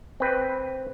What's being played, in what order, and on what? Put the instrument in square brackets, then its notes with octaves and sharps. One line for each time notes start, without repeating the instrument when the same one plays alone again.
[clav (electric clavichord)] C4 B4 G5